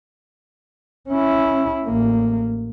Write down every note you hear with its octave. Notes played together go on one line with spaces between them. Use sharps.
C#4 E4
A1 A#3